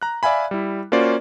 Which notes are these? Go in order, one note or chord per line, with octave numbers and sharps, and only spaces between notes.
A#5 F#6
D5 E5 F5 G#5 B5
G3 E4
A#3 C#4 F4 F#4 C5 D5